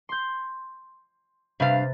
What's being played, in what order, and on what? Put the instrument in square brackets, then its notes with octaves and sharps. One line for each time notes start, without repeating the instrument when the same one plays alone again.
[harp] C6 G6
[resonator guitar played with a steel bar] G2 F5 [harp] C3 B4 A6